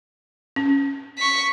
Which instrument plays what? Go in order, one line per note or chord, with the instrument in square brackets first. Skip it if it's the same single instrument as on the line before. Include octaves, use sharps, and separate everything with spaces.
[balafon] C#4
[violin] C#6 B6